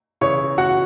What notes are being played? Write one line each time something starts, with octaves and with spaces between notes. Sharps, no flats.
C#3 E3 C#5 C#6
F#4 F#5